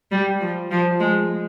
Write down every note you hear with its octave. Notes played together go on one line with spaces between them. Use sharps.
G3
F3
F3
G#3